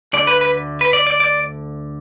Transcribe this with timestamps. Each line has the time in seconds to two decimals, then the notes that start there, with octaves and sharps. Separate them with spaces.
0.13 D2 D3 A3 D5
0.27 B4
0.41 B4
0.81 B4
0.93 D5
1.07 D5
1.20 D5